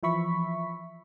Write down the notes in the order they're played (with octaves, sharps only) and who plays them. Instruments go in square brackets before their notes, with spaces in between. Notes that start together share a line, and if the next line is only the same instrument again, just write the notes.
[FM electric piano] E3 F3 E5 B5 C#6 B6